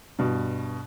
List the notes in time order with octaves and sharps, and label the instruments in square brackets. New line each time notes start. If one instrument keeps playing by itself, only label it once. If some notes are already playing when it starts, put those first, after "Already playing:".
[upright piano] G2 B2